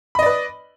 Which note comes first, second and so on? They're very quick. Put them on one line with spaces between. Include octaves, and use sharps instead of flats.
B5 D#5 D5 B4 D#6